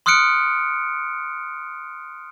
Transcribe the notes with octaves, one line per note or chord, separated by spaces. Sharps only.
C6 D#6 F6 F#6 C#7 D7